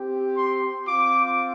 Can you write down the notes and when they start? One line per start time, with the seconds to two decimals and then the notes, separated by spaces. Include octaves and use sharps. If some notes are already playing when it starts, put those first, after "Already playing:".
Already playing: C4 G4
0.36 C6
0.87 C4 F4 D6